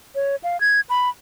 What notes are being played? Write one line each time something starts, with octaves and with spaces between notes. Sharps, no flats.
C#5
F5
G#6
B5